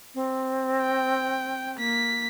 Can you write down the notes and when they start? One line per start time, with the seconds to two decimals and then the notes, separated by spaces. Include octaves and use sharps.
0.15 C4
0.82 G5
1.78 A#3 B6